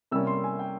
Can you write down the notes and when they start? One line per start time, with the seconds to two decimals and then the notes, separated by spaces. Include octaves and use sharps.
0.11 C3 G3 A#3 C#4 E6
0.27 C6
0.44 G#5
0.59 G5